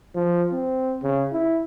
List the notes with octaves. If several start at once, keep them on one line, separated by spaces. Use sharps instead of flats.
F3
C4
C#3
E4